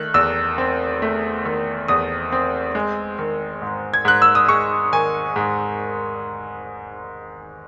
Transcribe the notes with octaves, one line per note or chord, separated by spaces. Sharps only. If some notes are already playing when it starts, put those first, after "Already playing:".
Already playing: D#3 A3 F#6
E2 E6
C4
A3
D#3
E2 D#6
C4
G#3
D#3
G#2
G#6
G#2 F#6
E6
D#6
G#3 C#6
D#3 G#5
G#2